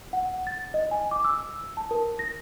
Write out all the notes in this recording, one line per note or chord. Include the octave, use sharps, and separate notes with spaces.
F#5
A6
D#5
G#5
D6
E6
A5
A#4
A#6